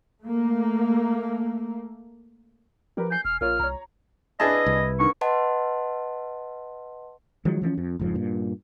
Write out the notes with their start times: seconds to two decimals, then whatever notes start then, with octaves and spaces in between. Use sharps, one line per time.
0.22 A3 A#3
2.97 F3 G4 A#4 B4
3.11 G#5 G6 C7
3.25 E1 F6
3.41 A#1 A#3 F4 C#5 F6
3.59 C2 C#5 A#5
4.40 D4 E4 G#4 B4 D#5 A5
4.66 C2
5.00 D3 D#3 C#6
5.21 B4 D#5 F#5 A5 C6
7.45 D#3 F3 F#3 G#3
7.62 E3 F3 G#3 C#4
7.78 F2
7.99 F#1 F2 G#2 F3
8.15 G2 A#2